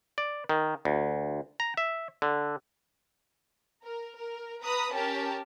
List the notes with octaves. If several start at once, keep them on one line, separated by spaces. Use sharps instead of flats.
D5
D#3
D2
A#5
E5
D3
A#4
A#4
B4 A#5 B5 D#6
C#4 G4 A#4 A5